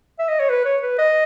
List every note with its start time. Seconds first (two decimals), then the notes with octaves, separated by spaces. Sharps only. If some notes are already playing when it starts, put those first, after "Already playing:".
0.19 E5
0.29 D#5
0.40 C#5
0.49 B4
0.65 C#5
0.82 B4
0.99 D#5